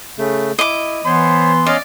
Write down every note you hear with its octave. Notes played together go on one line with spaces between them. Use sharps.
C#3 A3
E4 D#5 D6
E3 B3 C5 C#5 C6
C#4 D5 D#5 F5